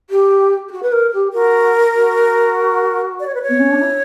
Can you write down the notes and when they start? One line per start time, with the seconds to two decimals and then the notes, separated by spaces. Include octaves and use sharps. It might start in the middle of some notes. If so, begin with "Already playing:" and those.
0.10 G4
0.68 G4
0.72 F#4
0.83 B4
0.92 A#4
1.14 G4
1.33 F#4 A#4
1.96 F#4
3.20 D5
3.27 C#5
3.35 B4
3.42 C#5
3.49 B3
3.59 C#4
3.71 D4
3.82 E4